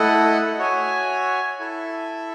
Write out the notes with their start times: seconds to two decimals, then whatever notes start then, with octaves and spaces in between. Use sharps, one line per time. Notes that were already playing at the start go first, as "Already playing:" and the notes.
Already playing: A3 E4 A4 D#5 F#5
0.58 F#4 C#5 E5 G#5
1.59 E4 A4 E5